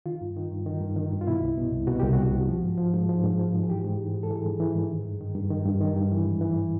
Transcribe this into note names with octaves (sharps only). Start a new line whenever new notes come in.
D#3 F4
G2
D#3
G2
D#3
G2
D#3
G2
F4
B2 E4
C2
B2
C2
B2 F#4
C2 G4
F#4
B2
C2
F3
G#2
F3
G#2
F3
G#2
F3
G#2
G#4
E3 G4
G#2
E3
G#2
A4
E3 G#4
G#2
E3
G#2
D#3
G2
D#3
G2
D#3
G2
D#3
G2
E3
G#2
E3